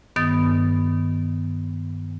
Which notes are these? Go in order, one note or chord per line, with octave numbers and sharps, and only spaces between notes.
G2 D#3 B3 D#6 A6